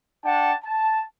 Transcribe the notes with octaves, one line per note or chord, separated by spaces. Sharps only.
D4 F#5 G5 A5
A5